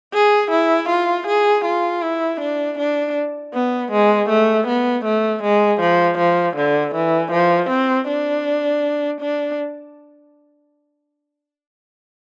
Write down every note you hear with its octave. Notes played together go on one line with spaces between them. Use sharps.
G#4
E4
F4
G#4
F4
E4
D4
D4
B3
G#3
A3
B3
A3
G#3
F3
F3
D3
E3
F3
C4
D4
D4